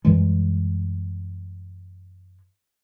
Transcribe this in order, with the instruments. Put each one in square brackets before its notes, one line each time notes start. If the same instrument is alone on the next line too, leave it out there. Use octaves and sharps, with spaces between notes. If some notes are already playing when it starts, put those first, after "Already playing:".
[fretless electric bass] F#2 E3 G3 G#3